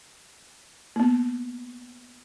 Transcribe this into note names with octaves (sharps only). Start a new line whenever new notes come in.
A#3 B3